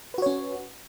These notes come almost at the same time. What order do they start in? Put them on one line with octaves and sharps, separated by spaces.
B4 F#4 C#5 C#4